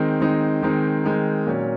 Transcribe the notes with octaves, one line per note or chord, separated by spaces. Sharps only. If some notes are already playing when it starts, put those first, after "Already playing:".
Already playing: D#3 G#3 C4 D#4
D#3 G#3 C4 D#4
D#3 G#3 C4 D#4
D#3 G#3 C4 D#4
A#2 F#3 C#4